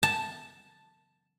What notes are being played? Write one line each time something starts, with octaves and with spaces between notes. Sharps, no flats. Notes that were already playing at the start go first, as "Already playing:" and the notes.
A5